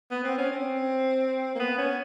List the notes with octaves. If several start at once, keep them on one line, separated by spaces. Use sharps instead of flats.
B3
C4
C#4
C4
A#3
B3
C#4